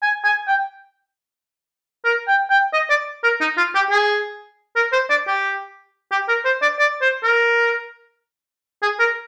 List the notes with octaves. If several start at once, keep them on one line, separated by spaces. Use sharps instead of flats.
G#5
G#5
G5
A#4
G5
G5
D#5
D5
A#4
D#4
F4
G4
G#4
A#4
C5
D5
G4
G4
A#4
C5
D5
D5
C5
A#4
G#4
A#4